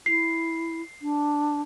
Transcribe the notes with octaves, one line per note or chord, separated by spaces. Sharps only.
E4 C7
D4